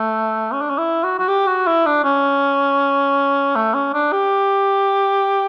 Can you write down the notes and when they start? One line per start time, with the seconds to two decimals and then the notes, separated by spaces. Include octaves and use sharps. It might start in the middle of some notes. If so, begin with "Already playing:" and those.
Already playing: A3
0.53 C#4
0.61 D4
0.70 C#4
0.78 E4
1.03 F#4
1.19 F#4
1.28 G4
1.47 F#4
1.67 E4
1.86 D4
2.04 C#4
3.56 A3
3.74 C#4
3.94 D4
4.12 G4